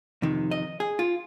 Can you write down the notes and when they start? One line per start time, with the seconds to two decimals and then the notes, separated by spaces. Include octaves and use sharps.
0.22 F2 C3 D#3
0.51 D#5
0.80 G#4
0.99 F4